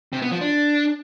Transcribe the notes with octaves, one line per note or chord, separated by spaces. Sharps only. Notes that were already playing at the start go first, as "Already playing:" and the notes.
C3
B3
F3
D4